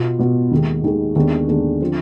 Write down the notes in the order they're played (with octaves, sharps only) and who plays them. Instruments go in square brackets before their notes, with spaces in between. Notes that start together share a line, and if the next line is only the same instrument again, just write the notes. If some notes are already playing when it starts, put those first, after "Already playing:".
Already playing: [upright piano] B2 B3 F4
B2 B3 F4
D#2 D#3 G#3
D#2 D#3 G#3
D#2 D3 G#3 B3 D4
D#2 D3 G#3 B3 D4
D3 F3 C4 F4